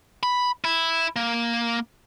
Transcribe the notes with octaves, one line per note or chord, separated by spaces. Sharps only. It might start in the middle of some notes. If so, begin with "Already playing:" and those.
B5
E4
A#3